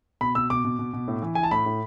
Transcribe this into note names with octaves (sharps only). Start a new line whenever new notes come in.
B2 B5
B2 E6
B2 D6
B2
B2
B2
A2
E3
E3 G#5
A5
A2 B5
A2